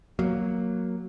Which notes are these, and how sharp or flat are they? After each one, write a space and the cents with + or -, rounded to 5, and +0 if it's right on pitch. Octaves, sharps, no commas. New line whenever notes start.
F#3 +0 A#3 +0